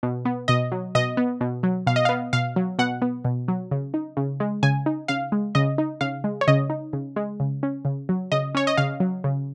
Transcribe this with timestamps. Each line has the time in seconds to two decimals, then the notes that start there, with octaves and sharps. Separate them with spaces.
0.03 B2
0.25 B3
0.48 B2 D#5
0.72 F#3
0.95 B2 D#5
1.17 B3
1.41 B2
1.63 F#3
1.87 B2 F5
1.96 D#5
2.05 B3 F5
2.33 B2 F5
2.56 F#3
2.79 B2 F#5
3.02 B3
3.25 B2
3.48 F#3
3.71 C#3
3.94 D#4
4.17 C#3
4.40 G#3
4.63 C#3 G#5
4.86 D#4
5.08 C#3 F5
5.32 G#3
5.55 C#3 D#5
5.78 D#4
6.01 C#3 F5
6.24 G#3
6.41 C#5
6.48 C#3 D#5
6.70 D#4
6.93 C#3
7.16 G#3
7.40 C#3
7.63 C#4
7.85 C#3
8.09 F#3
8.32 C#3 D#5
8.55 C#4 C#5
8.67 D#5
8.77 C#3 F5
9.00 F#3
9.24 C#3